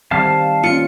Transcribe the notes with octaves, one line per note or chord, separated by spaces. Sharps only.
D#3 G3 C4 F5 A5 F6
A#3 C#4 F4 C#7